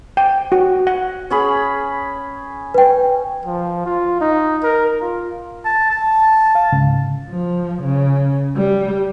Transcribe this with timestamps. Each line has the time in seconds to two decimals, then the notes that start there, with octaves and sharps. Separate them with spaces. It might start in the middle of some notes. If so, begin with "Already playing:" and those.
0.17 G5
0.52 F#4
0.87 F#5
1.30 C#4 G#4 B5
2.74 B4 G5
3.45 F3
3.86 F4
4.21 D#4
4.64 A#4
5.01 F4
5.65 A5
5.90 A5
6.55 F5
6.72 C#2 G#2 C#3
7.29 F3
7.82 C#3
8.56 G3